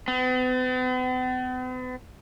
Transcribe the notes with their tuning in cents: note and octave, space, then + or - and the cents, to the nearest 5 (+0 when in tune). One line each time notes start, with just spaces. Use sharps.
B3 +45